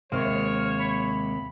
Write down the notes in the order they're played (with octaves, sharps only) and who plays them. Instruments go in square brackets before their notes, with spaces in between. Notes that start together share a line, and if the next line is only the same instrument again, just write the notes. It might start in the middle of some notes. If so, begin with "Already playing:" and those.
[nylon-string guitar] D#2 C3 [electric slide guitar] G#3 A#3 [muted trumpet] C#5 [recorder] F6
[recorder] B5